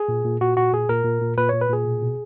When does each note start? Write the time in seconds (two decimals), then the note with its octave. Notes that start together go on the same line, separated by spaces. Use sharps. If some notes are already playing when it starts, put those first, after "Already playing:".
Already playing: G#4
0.08 A#2
0.25 A#2
0.41 A#2 F#4
0.57 A#2 F#4
0.73 A#2 G#4
0.88 A#2 A#4
1.05 A#2
1.21 A#2
1.38 A#2 B4
1.49 A#2 C#5
1.61 B4
1.69 A#2 G#4
1.85 B2
2.02 B2